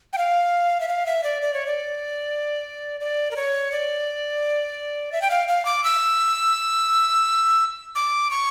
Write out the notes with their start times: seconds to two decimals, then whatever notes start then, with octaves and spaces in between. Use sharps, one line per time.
0.13 G5
0.18 F5
0.80 E5
0.88 F5
1.06 E5
1.24 D5
1.42 D5
1.54 C#5
1.67 D5
3.00 D5
3.31 A#4
3.36 C#5
3.72 D5
5.12 E5
5.22 G5
5.30 F5
5.48 F5
5.65 D6
5.84 E6
7.95 D6
8.31 C#6